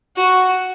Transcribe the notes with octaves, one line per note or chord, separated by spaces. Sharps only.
F#4